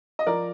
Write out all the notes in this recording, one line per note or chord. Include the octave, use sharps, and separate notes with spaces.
D#5
F3 A#4 D5